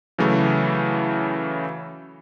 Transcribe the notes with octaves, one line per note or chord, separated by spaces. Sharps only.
C#3 E3 F#3 A3